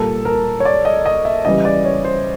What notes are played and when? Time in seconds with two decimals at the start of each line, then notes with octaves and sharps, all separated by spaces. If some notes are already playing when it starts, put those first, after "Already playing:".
Already playing: A#2 G3 A#3 A4
0.25 A#4
0.60 C#5
0.65 D5
0.85 D#5
1.06 D#5
1.25 E5
1.45 C#3 E3 G3 D#5
1.65 D5
1.85 C#5
2.05 C5